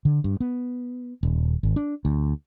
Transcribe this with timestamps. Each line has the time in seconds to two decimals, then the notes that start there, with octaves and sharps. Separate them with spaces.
0.05 D3
0.24 G2
0.40 B3
1.23 D#1
1.63 G#1
1.76 D4
2.05 D2